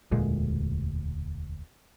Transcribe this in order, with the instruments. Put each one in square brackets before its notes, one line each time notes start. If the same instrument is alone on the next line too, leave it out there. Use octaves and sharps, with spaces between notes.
[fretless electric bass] E1 D2 A#2 G#3